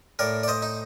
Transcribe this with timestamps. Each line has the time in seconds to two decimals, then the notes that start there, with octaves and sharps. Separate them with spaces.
0.19 A2 A#4 D5
0.43 D5
0.48 C5 D#5
0.62 D#4